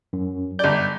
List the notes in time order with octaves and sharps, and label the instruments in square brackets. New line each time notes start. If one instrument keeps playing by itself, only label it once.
[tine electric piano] F#2
[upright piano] G1 D5 [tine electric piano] G6